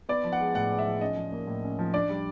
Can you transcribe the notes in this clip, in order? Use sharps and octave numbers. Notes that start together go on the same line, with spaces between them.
B3 D5
F3
F#5
G#3
A2 F#5
B3
E5
F3
C#4 D#5
F3
A#3
A2
C#4
F3
D4 D5
G3